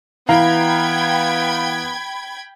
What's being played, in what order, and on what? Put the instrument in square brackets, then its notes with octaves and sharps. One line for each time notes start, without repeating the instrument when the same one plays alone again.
[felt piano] E3 E4 A#5 [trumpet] B3 [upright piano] F5 [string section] G5 B5 G#6